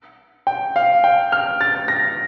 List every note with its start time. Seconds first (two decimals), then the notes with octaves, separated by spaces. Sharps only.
0.47 G5
0.76 F5
1.04 G5
1.32 F6
1.61 A6
1.88 A#6